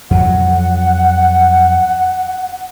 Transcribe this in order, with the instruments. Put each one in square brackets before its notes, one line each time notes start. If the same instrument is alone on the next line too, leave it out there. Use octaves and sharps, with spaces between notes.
[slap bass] F2 F#3 [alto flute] F#5